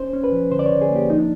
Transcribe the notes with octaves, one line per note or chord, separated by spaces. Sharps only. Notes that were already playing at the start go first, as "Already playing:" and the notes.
Already playing: C#4 C5
C#4
B4
F3
D3 C5
D5
C#5
D3
G#4
A#3
G4
F3 D#4
D4